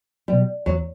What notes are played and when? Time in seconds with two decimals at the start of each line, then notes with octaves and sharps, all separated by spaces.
0.28 B2 F#3 G3
0.66 E2 F#3